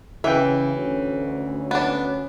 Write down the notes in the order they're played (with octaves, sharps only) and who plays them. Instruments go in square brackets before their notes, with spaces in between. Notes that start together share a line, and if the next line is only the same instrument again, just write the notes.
[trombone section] C#3 [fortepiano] E3 G5 [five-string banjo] E5
[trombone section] D2 C#4
[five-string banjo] B3 D4